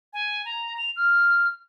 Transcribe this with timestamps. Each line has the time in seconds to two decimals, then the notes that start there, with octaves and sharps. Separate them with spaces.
0.13 G#5
0.45 A#5
0.78 F7
0.96 F6